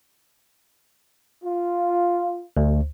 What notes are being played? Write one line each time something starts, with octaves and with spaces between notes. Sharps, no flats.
F4
D2